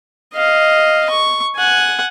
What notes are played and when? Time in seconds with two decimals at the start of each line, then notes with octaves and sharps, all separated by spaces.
0.34 D#5 F5
1.10 C#6
1.56 F#5 G#5